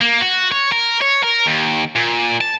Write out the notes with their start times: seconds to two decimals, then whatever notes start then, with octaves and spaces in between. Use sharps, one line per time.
0.01 A#3
0.21 F#4
0.52 C#5
0.72 A#4
1.01 C#5
1.23 A#4
1.46 D#2
1.96 A#2
2.41 A5